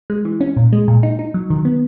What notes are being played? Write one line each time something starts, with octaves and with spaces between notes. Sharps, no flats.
G#3
E3
C#4
A#2
G#3
A#2
D#4
D#4
F#3
D#3
B3